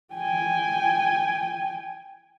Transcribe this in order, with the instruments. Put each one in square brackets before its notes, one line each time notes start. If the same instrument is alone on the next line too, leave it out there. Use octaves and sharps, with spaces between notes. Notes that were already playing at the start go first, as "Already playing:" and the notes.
[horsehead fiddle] G5 G#5